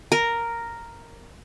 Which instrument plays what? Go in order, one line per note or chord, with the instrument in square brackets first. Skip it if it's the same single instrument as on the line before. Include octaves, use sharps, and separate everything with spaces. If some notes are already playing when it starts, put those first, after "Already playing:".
[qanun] A#4